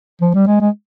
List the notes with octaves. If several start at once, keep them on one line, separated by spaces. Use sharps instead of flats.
F3
G3
G#3
G#3